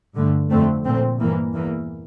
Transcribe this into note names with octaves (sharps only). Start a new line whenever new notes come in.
G2 D3 A3
F2 D3 A3 C4
A#2 A3 C4
G2 E3 A#3
E2 E3 A#3